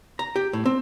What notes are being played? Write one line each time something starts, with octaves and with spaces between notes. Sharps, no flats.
A#5
G4
A2
C4